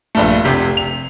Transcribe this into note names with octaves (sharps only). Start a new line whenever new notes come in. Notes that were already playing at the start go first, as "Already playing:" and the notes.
A#1 G2 A3
F1 C3 G4
F7